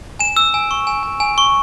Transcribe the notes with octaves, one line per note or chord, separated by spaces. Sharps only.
G#5 E7
E6
G#5
C#6
G#5
G#5
G#5
C#6